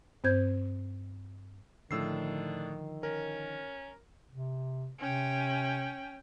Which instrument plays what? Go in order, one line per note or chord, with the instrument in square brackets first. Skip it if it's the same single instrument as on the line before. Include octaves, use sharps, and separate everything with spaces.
[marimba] G2 C4 C5 G6 G#6
[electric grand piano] A2 E6 C7 [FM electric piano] D3 F3 [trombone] D#3 [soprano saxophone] D4
[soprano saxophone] C#4 [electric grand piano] A#4
[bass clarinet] C3
[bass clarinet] C3 [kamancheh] C#4 G5